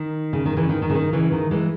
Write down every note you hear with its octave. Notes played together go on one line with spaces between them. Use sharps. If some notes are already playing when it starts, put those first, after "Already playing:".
Already playing: D#3
C#3
D#3
C#3 E3
D#3
D#3
C#3
D#3
C#3 E3
D#3
E3 G#3